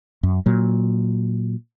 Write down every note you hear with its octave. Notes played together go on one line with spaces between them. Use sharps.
F#2
A#2 F#3